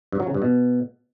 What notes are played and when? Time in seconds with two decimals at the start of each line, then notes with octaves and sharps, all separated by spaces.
0.12 G2
0.20 F#3
0.27 C#3
0.34 G2
0.42 B2